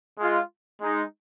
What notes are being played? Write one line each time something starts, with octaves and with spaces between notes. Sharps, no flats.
G#3 F4
G#3 D#4